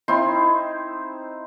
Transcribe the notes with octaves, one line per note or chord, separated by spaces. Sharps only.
C4 D#4 E4 C6